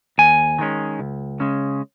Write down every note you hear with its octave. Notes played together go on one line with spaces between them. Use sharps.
D#2 G#5
D#3 G#3 C#4
C#2
C#3 G#3 C#4